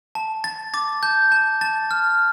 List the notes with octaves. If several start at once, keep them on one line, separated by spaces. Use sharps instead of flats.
A5
A5 A6
D6 A6
A5 G6
A5
A5 A6
F6